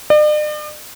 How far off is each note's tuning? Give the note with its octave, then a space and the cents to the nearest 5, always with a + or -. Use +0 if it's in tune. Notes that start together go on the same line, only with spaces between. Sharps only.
D5 +45